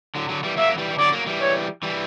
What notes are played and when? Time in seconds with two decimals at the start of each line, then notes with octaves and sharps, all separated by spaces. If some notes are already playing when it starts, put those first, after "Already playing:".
0.15 D3 F#3
0.29 D3 F#3
0.43 E3 G3
0.57 F#3 A#3 E5
0.69 F#3
0.78 E3 G3
0.91 E3
0.98 D3 F#3 D5
1.12 F#3 A#3
1.26 E3 G3
1.41 C#5
1.83 E3 G3